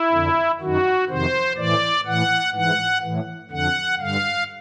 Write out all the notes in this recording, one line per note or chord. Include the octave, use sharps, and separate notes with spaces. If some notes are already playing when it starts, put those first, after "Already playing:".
Already playing: E4
F2 D3
F#2 D#3 F#4
F2 C3 D#3 C5
A2 E3 D5
A2 E3 F#5
G#2 E3 F#5
A2 E3
F2 D3 F#5
G2 D3 F5